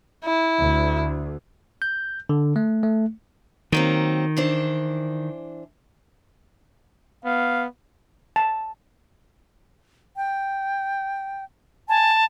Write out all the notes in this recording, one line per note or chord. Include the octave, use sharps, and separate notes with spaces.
E4
D2
G6
D3
A3
A3
D#3 F#3 A#3 C4
E3 D4 C5
B3 F5
A5
G5
G#5 A5